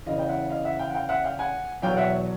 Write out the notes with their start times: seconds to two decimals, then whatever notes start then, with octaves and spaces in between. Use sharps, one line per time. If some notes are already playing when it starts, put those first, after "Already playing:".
0.06 E2 C#3 E3 D#5 F5
0.19 G5
0.29 E5 F#5
0.50 D#5 F5
0.65 E5 F#5
0.79 F5 G5
0.90 F#5
0.94 F5 G5
1.09 E5 F#5
1.24 F5 G5
1.39 F#5 G#5
1.82 E2 B2 F#3 F5 G5
1.97 E5 F#5